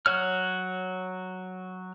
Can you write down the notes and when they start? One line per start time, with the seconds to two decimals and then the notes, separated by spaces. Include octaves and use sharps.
0.06 F#3 F#4 C#5 F6